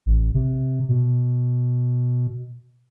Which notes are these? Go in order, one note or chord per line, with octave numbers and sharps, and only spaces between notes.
A1
C3
B2